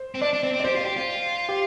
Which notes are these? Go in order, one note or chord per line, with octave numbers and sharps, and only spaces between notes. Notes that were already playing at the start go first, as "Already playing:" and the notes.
Already playing: C5
C4
D4 D5
D4
C4
C4
D5
G4 C5
F4
G4
F4
G4